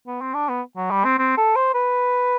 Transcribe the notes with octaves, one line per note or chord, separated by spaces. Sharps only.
B3
C4
D4
B3
F#3
G3
C4
C4
A4
C5
B4